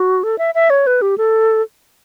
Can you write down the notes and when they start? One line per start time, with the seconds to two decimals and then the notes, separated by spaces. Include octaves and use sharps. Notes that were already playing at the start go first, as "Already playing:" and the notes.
Already playing: F#4
0.23 A4
0.38 E5
0.55 E5
0.70 C#5
0.87 B4
1.02 G4
1.18 A4